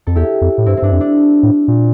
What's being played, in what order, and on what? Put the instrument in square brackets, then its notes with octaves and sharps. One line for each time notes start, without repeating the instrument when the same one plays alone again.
[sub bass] F2 [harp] A4
[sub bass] E2 [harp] E4 G4
[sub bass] F2
A2
[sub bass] G2 [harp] C4 E4
[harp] C4
[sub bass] G2 [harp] D4
[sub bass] F2
[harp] D4
[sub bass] A2
A#2